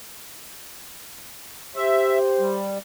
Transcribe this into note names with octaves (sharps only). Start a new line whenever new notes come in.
G4 C5 E5
G3